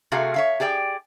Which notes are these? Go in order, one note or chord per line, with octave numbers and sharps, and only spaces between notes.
C3 A3 C4 F#4 G#4 F5
C#5 E5 F5
G4 G#4 D5 D#5 G5